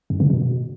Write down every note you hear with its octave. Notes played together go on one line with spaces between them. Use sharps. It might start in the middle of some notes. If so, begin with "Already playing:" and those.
F#2
C#3
B2